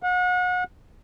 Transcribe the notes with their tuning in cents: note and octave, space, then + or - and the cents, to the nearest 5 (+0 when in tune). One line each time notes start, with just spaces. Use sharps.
F#5 -35